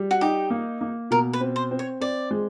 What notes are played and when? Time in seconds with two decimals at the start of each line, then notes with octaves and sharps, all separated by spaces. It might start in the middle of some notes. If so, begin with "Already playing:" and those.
Already playing: G3
0.11 F#4
0.21 D#4 G4
0.50 A#3
0.81 A#3
1.11 B2 A#4
1.33 B4
1.40 C4
1.56 C5
1.71 C4
1.79 C#5
2.01 C4 D5
2.31 G#3